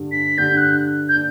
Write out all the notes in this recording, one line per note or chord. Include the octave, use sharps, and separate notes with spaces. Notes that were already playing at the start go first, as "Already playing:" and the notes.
Already playing: G2 D3 G3 D4
B6
G2 D3 G3 D4 G6
F#6
G6
D4